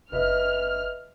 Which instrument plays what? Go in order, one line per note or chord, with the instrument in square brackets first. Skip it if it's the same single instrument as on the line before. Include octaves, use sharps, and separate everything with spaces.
[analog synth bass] F#1 [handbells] B4 D#5 E5 [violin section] F6